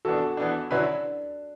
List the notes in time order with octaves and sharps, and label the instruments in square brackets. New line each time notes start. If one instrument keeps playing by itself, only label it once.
[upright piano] E3 B3 D4 [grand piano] F#4 A4
[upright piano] E3 B3 D4
[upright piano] D3 F#3 C#4 E4 B4 [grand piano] D4